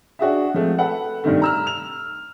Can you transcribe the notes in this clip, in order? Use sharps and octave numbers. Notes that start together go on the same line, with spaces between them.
D4 F#4 G#4 E5
F3 G#3 A3 C4
A4 B4 F#5
G2 C3 D#3 A3
A#5 E6 F6
F7